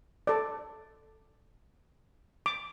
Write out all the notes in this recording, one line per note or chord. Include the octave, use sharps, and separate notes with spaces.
A4 D5
D6